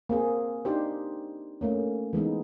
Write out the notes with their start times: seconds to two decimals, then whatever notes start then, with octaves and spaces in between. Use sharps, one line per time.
0.09 A#3 C4 G#4
0.65 D4 D#4 G4 C5
1.61 A3 A#3 C#4
2.13 E3 G#3 B3 D#4